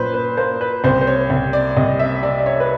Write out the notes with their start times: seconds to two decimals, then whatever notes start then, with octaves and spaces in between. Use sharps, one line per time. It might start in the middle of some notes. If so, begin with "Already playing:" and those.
Already playing: A#2 F#3 B4 C5
0.14 B4
0.37 A#3 C5
0.61 B4
0.84 C2 C5
1.01 C5
1.07 C#5
1.30 C2
1.53 D5
1.76 C2 D#5
1.99 E5
2.22 C3 D5
2.39 D5
2.46 C#5
2.60 B4